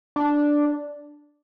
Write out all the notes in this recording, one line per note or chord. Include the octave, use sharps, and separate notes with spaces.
D4